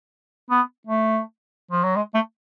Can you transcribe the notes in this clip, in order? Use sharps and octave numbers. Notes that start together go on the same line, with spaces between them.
B3
A3
F3
F#3
G#3
A3